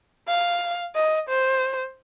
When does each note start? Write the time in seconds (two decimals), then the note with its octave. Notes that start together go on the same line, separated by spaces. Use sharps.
0.28 F5
0.95 D#5
1.29 C5